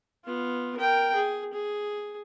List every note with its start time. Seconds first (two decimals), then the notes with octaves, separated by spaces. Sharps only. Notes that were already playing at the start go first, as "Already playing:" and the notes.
0.25 B3 F4
0.77 A#4 G5
1.15 G#4
1.53 G#4